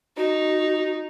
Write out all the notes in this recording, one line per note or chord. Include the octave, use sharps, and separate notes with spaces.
D#4 F#4